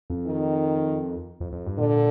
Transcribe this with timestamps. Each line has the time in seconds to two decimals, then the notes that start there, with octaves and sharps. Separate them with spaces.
0.10 F2
0.27 D#3
1.40 F2
1.53 F2
1.66 G2
1.78 A#2 D3